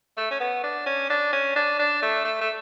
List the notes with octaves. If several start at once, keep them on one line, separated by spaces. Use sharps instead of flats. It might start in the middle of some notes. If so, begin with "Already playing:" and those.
A3
C#4
B3
D4
C#4
D4
C#4
D4
D4
A3
A3
A3